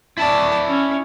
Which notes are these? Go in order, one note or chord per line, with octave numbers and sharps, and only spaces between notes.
E4 D5 A5
C#4